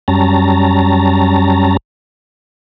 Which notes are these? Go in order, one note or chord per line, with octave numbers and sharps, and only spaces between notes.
F#2 G3 C#4 A5 A#5